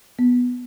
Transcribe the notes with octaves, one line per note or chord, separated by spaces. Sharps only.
B3